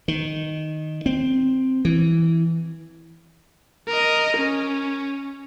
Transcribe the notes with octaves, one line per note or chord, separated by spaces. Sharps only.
D#3
C4
E3
A#4 D#5
C#4